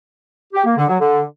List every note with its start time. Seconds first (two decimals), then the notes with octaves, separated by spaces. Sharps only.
0.54 G4
0.65 A#3
0.76 D3
0.88 F#3
0.99 D3